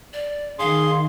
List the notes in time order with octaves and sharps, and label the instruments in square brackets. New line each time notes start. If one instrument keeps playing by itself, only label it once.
[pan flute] D5
[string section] D#3 [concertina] G#4 C6 [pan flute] F5